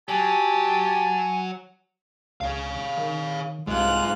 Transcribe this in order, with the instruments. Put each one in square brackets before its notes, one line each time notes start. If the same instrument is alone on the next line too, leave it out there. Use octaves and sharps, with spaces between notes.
[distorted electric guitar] F#3 [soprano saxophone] G4 [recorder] G#5 [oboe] A5
[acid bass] C#2 [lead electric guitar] C#5 F5
[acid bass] D#3
[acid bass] C2 [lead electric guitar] G#2 G#3 [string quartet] F4 F#6